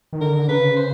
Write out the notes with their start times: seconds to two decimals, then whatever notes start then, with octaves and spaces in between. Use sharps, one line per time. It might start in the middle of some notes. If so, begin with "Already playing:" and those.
0.13 D#3
0.21 D3 A#4
0.48 C#3 B4
0.76 C5